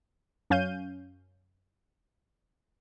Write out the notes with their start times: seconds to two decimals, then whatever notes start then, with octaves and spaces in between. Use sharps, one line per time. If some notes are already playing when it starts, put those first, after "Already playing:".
0.50 F#2 C#4 F5 G6 D#7